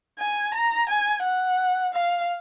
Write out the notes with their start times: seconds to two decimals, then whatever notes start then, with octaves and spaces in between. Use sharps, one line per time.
0.19 G#5
0.54 A#5
0.89 G#5
1.24 F#5
1.93 F5